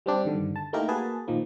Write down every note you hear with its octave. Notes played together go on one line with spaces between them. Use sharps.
G3 C4 D4 G4
G2 D3 D#3
A5
A3 A#3 D#4 E4 G4 A#4
A#3 F#4 G#4 B4 A5
A#2 D#3 F3 A#3